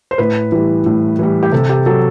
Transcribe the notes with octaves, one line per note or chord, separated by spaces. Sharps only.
C5
A2 B4
E3 G3
A2
E3 G3
G4
C3 A4
G4
F#3 A4